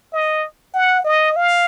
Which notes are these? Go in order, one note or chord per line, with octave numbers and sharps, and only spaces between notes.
D#5
F#5
D#5
F5